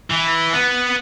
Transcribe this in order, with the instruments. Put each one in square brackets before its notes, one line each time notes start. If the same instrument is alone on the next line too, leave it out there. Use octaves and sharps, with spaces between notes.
[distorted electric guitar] E3
B3